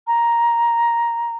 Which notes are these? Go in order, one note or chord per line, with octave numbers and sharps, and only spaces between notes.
A#5